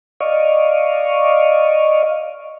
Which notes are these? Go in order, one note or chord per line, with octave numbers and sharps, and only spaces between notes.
D5 D#5 F5 C#6